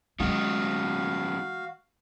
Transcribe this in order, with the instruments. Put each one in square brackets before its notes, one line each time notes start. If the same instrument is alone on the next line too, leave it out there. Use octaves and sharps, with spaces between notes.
[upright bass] E3 G#3 [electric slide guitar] F#3 C#4 D#4 [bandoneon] F#4 F5